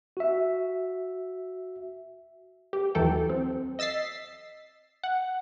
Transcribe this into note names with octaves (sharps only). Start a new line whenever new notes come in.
F#4 E5
G4
D#2 E3 F#3 A4 G5
C4
D#5 E6 A6 B6 C7
F#5